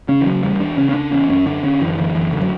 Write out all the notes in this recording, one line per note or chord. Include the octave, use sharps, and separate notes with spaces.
C#3 C#4
E3
C#3 F#3
E2 G3
E2 D4
C#3 C#4
C#4
C#3 D4
E2 C#4
F#2 C#4
D3 D4
D3 C#4
F#2 E3
D3 E3
F#2 E3
F#2 D3
F#3